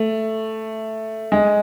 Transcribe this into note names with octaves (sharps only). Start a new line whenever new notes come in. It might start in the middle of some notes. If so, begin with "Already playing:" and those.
Already playing: A3
G#3